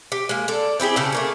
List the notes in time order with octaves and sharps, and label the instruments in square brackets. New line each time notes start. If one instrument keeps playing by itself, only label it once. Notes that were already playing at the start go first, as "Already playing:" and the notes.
[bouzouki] G4
G#3 A#3
A4 D5
C4 E4 G4 G#4
C#3 A4
A3 A#3 G#4